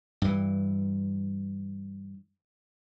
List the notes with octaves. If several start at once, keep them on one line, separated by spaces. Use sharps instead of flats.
G2 E3